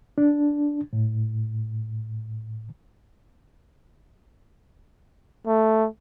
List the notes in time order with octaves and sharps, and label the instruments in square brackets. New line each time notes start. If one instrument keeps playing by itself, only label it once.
[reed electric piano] D4
A2
[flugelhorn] A3